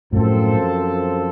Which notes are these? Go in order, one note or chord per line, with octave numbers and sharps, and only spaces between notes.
F#2 A2 F3 C4 F4 A4